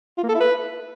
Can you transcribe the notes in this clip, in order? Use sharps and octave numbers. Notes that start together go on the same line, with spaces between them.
F4
A#3
A4
E4
B4